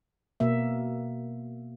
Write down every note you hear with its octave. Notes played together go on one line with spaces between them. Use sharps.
B2 A#3 E5